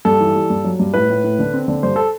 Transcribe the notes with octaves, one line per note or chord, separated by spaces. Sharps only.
G2 A4
E3
G3
G2
F#3
G2
A2 B4
A2
A2
D3
C4
D3
G2 C5
A4